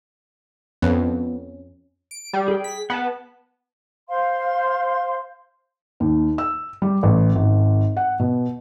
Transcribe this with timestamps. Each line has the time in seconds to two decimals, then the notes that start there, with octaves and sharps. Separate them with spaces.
0.82 F2 B3 C#4
2.11 D7
2.33 G3
2.48 G#4 G5
2.64 B6
2.90 B3 F#5 A5
4.09 C5 F5 C6
6.00 D#2
6.38 E6
6.82 G3
7.03 A1
7.35 G#1
7.97 F#5
8.19 B2